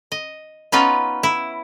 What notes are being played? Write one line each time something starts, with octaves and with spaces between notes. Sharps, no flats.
D#5
B3 C#4 D#4 F4 B4
E4